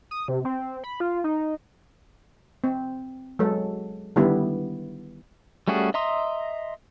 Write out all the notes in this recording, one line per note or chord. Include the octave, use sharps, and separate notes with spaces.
D#6
C3
C4
B5
F4
D#4
C4
F#3 G#3 A4
D3 D#3 G3 B3 E4 G4
G3 A3 C#4 F#4 G#4
D#5 E5 A#5 C6 D#6